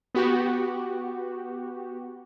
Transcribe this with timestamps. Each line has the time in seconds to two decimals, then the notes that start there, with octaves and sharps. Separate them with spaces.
0.15 B3 F#4 G4